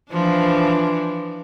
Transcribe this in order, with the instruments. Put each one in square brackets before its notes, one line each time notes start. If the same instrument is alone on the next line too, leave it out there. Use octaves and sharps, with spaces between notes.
[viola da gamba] E3 F3 D4